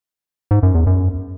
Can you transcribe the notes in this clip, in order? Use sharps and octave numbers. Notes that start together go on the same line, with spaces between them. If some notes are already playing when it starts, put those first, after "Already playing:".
G#2
F#2
E2
F#2